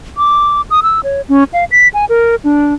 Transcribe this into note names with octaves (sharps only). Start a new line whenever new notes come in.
D6
D#6
E6
C#5
C#4
F5
B6
G#5
A#4
D4